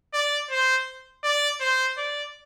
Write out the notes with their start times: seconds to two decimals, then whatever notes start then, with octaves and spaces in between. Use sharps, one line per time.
0.14 D5
0.51 C5
1.24 D5
1.61 C5
1.98 D5